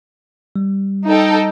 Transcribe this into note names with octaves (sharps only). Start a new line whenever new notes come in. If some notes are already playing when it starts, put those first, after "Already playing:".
G3
D#4 A4 G5